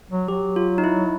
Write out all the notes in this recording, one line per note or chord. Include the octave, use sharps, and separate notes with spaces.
F#3
F#3 G4
F4
D#4
E4